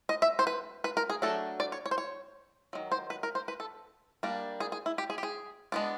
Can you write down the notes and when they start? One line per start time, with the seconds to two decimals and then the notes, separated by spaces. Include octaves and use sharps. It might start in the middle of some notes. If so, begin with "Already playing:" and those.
0.09 D#5
0.22 E5
0.39 C5
0.47 B4
0.84 B4
0.97 A#4
1.10 G#4
1.22 F#3 A3 D4 A4
1.60 D5
1.72 C#5
1.86 C#5
1.91 C5
1.98 C#5
2.73 D#3 F#3
2.92 C5
3.10 B4
3.23 A#4
3.35 C5
3.48 B4
3.60 A4
4.23 G3 A#3 D4
4.60 G#4
4.72 G#4
4.86 E4
4.98 G4
5.10 G#4
5.18 G4
5.23 G#4
5.72 G#3 B3 D4